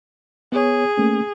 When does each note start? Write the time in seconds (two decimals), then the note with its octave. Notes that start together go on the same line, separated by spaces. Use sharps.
0.52 B3 G#4 C#5
0.97 A3 A#3 C#4